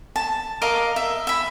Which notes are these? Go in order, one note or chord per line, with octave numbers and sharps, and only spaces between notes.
A5
A#4 D#5 F5 D6
E5
E5 B5